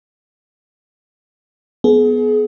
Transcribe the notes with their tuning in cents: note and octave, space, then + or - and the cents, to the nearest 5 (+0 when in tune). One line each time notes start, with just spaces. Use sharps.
B3 +0 G#4 +35